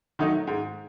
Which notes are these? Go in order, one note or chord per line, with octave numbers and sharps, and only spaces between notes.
D#3 F#3 A3 D#4
G#2